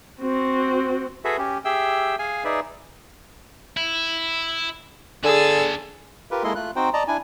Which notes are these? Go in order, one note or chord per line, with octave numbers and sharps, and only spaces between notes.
C4 F#4
F#4 G#4 A4 B4 E5
C#4 G4
G4 G#4 E5 G5 E6
G#4 F5 G#5
D#4 G#4 B4 D5 E5
E4
D3 D4 G#4 G#5 E6 A6
F4 G4 A#4 B4
G#3 A#3 E4 A4 D#5 C6
A3 F4 F#6
C4 D#4 F#4 C5 G5
D5 D#5 A5 A#5
D4 E4 G#5